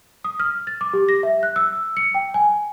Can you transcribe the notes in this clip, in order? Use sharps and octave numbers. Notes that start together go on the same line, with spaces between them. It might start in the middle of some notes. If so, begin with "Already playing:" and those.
D#6
F6
A6
D6
G4
A#6
E5
F#6
E6
C#7
G5
G#5